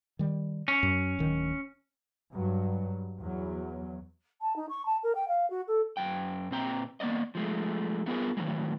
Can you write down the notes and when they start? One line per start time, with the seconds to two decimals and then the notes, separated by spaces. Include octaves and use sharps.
0.19 D#3 G3
0.68 C#4
0.83 F#2
1.19 D1 D#3
2.31 G2 F#3
3.20 E2 F#3
4.41 A5
4.56 D#4
4.69 C#6
4.86 A5
5.03 A#4
5.15 G5
5.28 F5
5.50 F#4
5.67 A4
5.97 F#2 G5
6.51 A#2 C4 G5 A#5
7.00 A#3 B3 D5 D#5
7.35 F3 G#3 A3
8.06 A3 B3 F4 G#4 A#4
8.37 A2 D#3 E3 F#3 G#3